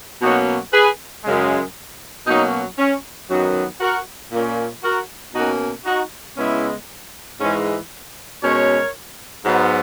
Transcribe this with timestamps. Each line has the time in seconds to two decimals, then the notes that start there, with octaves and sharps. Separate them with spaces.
0.21 B2 F#3 A#3 C#4 D#4 F#4
0.72 G#4 B4
1.24 F#2 C#3 G#3
2.27 B2 F#3 A#3 C#4 D#4
2.78 C#4
3.29 F#2 D#3 F#3 B3 D#4 F#4
3.80 F#4 A#4
4.32 A#2 A#3 C#4
4.83 F#4 A#4
5.35 B2 A#3 C#4 D#4 F#4
5.86 D#4 F#4
6.37 C#3 G#3 B3 C#4 E4
7.40 G#2 E3 G#3 C#4
8.42 B2 G#3 C#4 A#4 C#5
9.45 G#2 F#3 B3